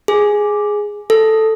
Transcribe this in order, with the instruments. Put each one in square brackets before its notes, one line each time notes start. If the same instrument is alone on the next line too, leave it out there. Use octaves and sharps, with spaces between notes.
[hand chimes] G#4
A4